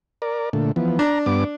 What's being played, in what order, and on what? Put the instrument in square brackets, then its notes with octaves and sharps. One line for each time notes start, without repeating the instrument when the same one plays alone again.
[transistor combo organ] A#4 D5
A#2 D3 A3
E3 F3 B3
[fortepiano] D4 [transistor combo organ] A#5
[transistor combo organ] G2 B3 D6